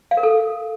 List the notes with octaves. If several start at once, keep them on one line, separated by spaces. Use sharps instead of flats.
F5
A#4
A4